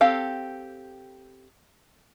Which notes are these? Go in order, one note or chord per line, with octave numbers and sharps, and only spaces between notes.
C4 G4 A4 F5